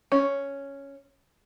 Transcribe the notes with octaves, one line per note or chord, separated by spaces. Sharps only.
C#4